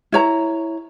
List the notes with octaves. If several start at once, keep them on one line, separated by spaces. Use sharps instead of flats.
E4 C#5 A#5